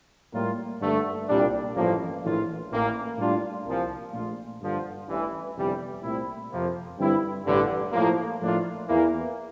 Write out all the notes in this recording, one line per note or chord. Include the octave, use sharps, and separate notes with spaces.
A2 G3 A#3 F4
G2 D3 A3
C2 A#2 G3 D4
A1 G2 F3 A#3
A#1 A2 E3 A#3 F4
A1 A2 E3 A#3
A2 G3 D4 F4
C2 A#2 F3
A#1 A#2 A3 D4 F4
G2 D3 F3
A1 G2 E3
G1 F2 C3 E3 G3
C2 A#2 A3 C4 E4
F2 C3 F3 A#3
G2 D3 G3 C4 E4
A1 G2 D3
A2 F3 A#3
A2 F3 A#3 D4 F4
E2 E3 A#3